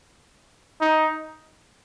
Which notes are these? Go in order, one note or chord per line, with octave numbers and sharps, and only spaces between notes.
D#4